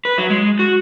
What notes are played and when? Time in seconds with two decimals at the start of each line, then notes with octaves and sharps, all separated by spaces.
0.05 B4
0.18 F#3
0.30 G#3
0.59 F#4